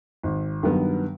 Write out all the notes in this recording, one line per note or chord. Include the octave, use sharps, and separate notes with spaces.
G#1
G2 D#3 F#3 B3